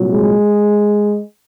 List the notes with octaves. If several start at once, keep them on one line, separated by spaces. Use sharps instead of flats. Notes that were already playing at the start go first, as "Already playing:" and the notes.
Already playing: C2 A#2 F#3
G#3